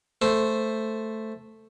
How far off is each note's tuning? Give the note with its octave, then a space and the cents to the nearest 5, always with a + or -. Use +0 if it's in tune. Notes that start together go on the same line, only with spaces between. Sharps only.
A3 +0 C5 +0